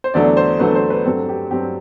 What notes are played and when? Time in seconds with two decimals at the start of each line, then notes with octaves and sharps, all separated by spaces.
0.04 C5
0.14 E2 D3 F#3 A3 D4 D5
0.37 C5
0.59 E2 D3 F#3 A3 D4 B4
0.75 C5
0.90 B4
1.06 G2 F#3 C4 A4
1.29 G4
1.51 G2 F#3 C4 G4